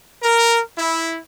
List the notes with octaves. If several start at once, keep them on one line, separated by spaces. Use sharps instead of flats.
A#4
E4